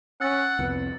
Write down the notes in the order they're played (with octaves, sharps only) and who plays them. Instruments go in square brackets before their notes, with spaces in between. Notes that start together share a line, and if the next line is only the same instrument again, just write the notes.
[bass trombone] C#4 [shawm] F#5 [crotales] E6 A6
[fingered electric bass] C2 F2 C4 [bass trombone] B3